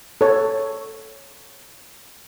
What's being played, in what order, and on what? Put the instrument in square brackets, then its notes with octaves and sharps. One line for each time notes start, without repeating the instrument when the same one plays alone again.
[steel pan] A4 C#5